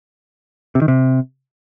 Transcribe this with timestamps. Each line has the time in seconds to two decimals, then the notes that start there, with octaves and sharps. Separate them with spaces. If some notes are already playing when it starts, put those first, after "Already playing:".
0.75 C3
0.82 D#3
0.88 C3